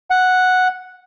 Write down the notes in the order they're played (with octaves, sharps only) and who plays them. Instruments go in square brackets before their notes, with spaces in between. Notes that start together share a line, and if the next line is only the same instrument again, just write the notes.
[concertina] F#5